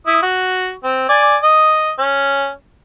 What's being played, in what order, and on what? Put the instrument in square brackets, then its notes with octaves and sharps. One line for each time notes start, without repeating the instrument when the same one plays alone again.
[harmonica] E4 D#6
F#4
C4
D5 G#5
D#5
C#4